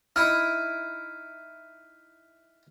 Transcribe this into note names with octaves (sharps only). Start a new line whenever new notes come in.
D#4 E4 F6